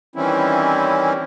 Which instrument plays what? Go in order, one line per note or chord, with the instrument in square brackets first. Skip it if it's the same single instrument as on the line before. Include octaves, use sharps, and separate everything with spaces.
[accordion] D#3 E3 G3 C4 C#4 E4